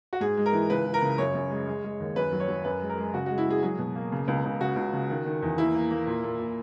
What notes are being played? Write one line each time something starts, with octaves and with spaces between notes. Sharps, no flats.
F#4
G#2 G#4
G#3
A#4
E3
C#2 B4
E3
A#4
C#3
F#2 C#5
F#2
G#3
G#3
G#3
D#2
F#2 B4
F#3
C#5
F#3
F#2 B4
G#3
A#4
G#3
C#3 F#4
G#3 F#4
E4
G#3 G#4
F#3 G#4
B2
A#3
C#3
C#2
C#2
C#3 F#4
C#2
C#3
D#3
D#3
E2
A#3 E4
A#3
A#3
A#2
A#2
A#2